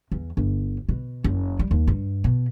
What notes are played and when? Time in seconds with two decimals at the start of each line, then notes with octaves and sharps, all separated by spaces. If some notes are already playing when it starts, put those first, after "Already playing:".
0.12 E2
0.37 G1
0.89 B2
1.24 F#1
1.59 G3
1.71 D#2
1.87 G2
2.24 B2